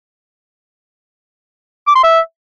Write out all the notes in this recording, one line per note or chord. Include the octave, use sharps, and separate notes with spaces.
D6
C6
E5